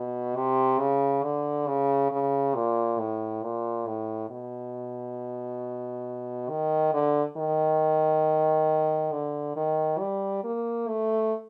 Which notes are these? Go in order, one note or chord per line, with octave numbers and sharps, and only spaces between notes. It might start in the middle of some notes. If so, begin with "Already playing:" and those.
Already playing: B2
C3
C#3
D3
C#3
C#3
A#2
A2
A#2
A2
B2
D#3
D3
D#3
D3
D#3
G3
A#3
A3